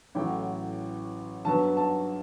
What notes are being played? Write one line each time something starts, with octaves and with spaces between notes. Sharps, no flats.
A1 A2 F#3 G5
G2 F#3 B3 A5
A5